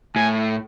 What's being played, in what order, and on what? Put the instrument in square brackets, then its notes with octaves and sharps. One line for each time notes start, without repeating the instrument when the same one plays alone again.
[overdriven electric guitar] A2 [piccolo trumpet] G#5